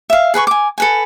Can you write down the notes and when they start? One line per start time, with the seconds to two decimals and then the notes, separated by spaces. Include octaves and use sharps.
0.10 E5 F5
0.34 G#4 B4 A#5 C#6
0.47 G#5 D6
0.78 A4 B4 G#5